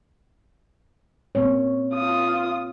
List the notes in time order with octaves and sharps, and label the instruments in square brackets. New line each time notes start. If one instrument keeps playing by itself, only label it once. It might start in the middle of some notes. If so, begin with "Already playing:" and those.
[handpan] A#3 C4 C#5
[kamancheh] F4 D#6